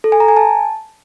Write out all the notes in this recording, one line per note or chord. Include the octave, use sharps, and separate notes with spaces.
A4
G#5
A#5
G#5
A5